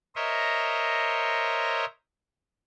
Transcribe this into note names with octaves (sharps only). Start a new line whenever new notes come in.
A#4 C5 C#5 D#5 E5 A#5